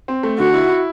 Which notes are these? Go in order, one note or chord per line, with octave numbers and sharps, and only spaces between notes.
C4
A3
D3 F#4
E4
E4